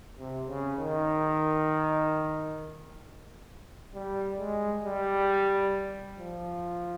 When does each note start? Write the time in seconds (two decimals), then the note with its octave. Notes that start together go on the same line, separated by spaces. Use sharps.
0.18 C3
0.48 C#3
0.78 D#3
3.94 G3
4.39 G#3
4.85 G3
6.19 F3